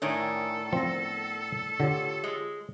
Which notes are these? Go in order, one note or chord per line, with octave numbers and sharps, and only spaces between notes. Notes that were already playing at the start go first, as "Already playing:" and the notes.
A2 D#3 D4 A4 C#5 G#5 D#6
F3 B3 C4 A#6
D3 F4 G4 C#5
G#3